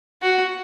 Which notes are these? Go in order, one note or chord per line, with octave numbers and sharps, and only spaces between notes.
F#4